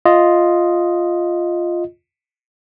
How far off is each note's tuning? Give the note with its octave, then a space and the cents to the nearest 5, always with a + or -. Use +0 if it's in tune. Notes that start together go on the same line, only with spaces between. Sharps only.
F4 +0 D#5 +0